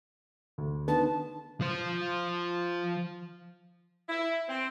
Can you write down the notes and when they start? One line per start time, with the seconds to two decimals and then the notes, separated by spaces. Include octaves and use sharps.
0.58 D2
0.88 D3 D#3 B3 A5
1.61 F3 C5
4.09 E4
4.48 C4